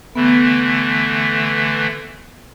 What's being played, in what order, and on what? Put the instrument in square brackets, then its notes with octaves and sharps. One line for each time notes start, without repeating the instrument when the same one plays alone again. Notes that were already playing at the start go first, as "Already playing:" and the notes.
[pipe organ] D3 E3 A3 [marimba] B3